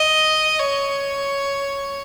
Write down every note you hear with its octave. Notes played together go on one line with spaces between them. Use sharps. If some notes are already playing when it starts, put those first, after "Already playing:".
Already playing: D#5
C#5